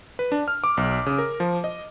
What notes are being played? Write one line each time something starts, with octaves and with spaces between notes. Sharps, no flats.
B4
D4
F6
D6
B1
C#3
A#4
F3
D#5